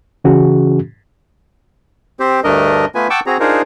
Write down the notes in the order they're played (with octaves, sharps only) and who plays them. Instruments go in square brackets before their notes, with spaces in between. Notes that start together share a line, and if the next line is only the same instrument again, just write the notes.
[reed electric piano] C#3 E3 C#4 F#4 G#4
[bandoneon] C4 G4 C5
D2 G2 A3 D4 A#4 D#5
A3 B3 F4 B4 G#5
F#5 G5 A5 C#6 D6 E6
C4 F#4 G#4 A#5
D4 D#4 F4 G#4 A#4 C5